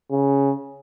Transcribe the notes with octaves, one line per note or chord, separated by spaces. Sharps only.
C#3